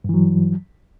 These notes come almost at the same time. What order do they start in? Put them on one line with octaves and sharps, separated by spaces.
G2 E3 F#3